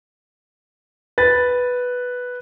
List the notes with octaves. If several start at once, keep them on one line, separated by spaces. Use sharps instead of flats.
B4 A6